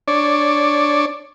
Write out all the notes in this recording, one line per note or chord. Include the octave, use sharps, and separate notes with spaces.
D4 C#5 D5